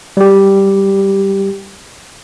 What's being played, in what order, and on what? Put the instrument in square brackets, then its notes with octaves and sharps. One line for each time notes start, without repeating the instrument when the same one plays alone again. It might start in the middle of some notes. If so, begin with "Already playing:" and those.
[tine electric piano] G3 G4